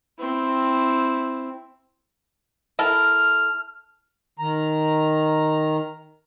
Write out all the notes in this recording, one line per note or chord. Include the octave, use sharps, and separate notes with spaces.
C4 E4
E4 A4 A#4 F6
D#3 A#5